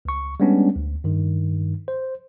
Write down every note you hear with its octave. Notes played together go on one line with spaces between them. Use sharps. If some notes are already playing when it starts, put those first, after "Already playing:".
C#2 C#6
G3 G#3 B3 C#4 D4
D2
G2 D#3
C5